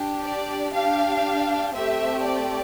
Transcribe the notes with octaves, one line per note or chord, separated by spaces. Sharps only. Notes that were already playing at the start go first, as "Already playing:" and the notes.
Already playing: D4 G4
D5
D4 G4 F5
A3 C4 G4 E5
D5